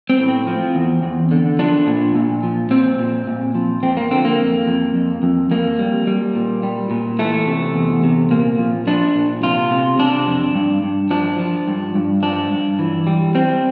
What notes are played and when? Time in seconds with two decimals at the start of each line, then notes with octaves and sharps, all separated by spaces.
0.10 C4
0.19 A2
0.28 C4
0.47 F3
0.75 E2
1.03 E2
1.31 D3
1.59 F3 D4
1.87 A#2
2.15 A#2
2.43 F3
2.71 A#2 C4
2.99 A#2
3.27 A#2
3.55 F3
3.83 F2 C4
3.97 A#3
4.11 D3 C4
4.25 A#3
4.39 F2
4.68 F2
4.95 F2
5.23 F2
5.51 F2 A#3
5.79 G3
6.07 G3
6.35 A#2
6.63 G3
6.91 A#2
7.19 E3 A3
7.47 C3
7.75 E2
8.04 C3
8.31 A#2 A#3
8.59 F3
8.87 F3 D4
9.15 A#2
9.43 C3 F4
9.71 C3
9.99 C3 D4
10.27 F2
10.55 G2
10.83 G2
11.11 F3 D4
11.39 F3
11.68 G2
11.95 G2
12.23 F3 D4
12.51 G2
12.79 E3
13.07 G3
13.35 G3 C4